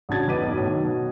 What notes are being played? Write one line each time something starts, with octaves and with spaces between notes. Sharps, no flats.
A1 C#3 D4 F#4 G#6 A6
E2 D#4 B4 D6 D#7
B1 B2
B1 A2
D#3 F#3
B2